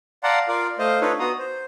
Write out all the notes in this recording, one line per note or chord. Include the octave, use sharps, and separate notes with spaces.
D5 F5 F#5 A5 A#5 C6
F4 A#4 D5 F5
A3 C5 D#5 F5
D4 D#4 F4 A4 B4 C#5
B3 F#4 A#5 C6 D#6
C5